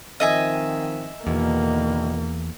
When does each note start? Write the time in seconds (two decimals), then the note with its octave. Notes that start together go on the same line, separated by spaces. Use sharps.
0.20 D#3 F3 C4 D#5 E5 G#5
1.27 E2 B2 D3 D#3 A#3